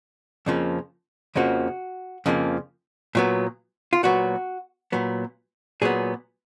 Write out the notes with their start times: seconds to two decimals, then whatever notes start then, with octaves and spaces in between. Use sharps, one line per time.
0.46 F2 C#3 F3 A#3
1.36 F2 C#3 F3 A#3 F#4
2.26 F2 C#3 F3 A#3
3.15 A#2 F#3 B3
3.93 F4
4.03 A#2 F#3 B3 F#4
4.92 A#2 F#3 B3
5.82 A#2 F#3 B3 G#4